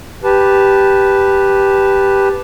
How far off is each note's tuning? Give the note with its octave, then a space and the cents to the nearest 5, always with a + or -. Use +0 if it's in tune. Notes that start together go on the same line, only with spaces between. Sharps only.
G4 +0 B4 +0 A5 -10